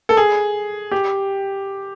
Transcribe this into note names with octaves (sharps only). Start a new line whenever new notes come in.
A4
G#4
G4